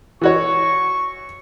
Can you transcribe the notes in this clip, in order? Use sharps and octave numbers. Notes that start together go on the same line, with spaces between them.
E3 F#4 C#5 C#6